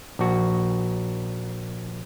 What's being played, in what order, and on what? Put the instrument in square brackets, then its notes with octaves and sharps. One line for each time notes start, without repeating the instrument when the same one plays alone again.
[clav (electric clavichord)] A#1 F#4